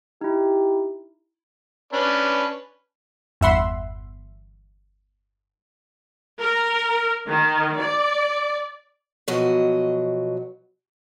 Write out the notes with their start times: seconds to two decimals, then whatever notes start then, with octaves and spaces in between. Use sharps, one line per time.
0.21 D#4 E4 G4
1.93 C#4 D4 B4
3.41 G1 E2 E5 F#5 B5 C6
6.40 A#4
7.27 D#3
7.80 D5
9.28 B2 F3 F#3 D#5